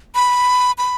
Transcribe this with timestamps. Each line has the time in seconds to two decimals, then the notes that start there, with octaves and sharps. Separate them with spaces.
0.15 B5
0.78 B5